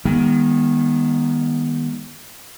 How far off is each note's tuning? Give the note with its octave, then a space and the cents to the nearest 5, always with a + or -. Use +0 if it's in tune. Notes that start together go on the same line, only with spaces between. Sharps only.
D#3 +0 G#3 -45 B3 -30